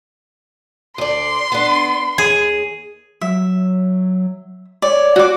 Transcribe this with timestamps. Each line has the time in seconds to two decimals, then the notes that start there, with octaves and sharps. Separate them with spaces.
0.98 D2 D5 C6
1.52 B3 D4
2.18 D#2 G#4
3.21 F#3 E5
4.82 C#5 D5
5.16 F#4 D6